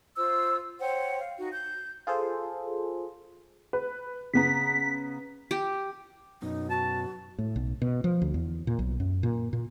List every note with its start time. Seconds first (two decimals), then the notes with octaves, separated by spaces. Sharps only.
0.16 F4 C5 E6
0.80 C5 C#5 F#5 G5
1.20 F5
1.37 D#4 F#4
1.52 G6
2.07 F4 G#4 A4 C5
3.73 B4
4.33 C#3 B3 A#5 B6
5.51 G4
6.42 F#2 B2 D#4
6.70 F#4 A5
7.38 A2
7.56 B1
7.82 B2
8.04 F3
8.22 D2
8.34 E2
8.67 A#2
8.79 B1
9.00 F#2
9.23 A#2
9.53 A#2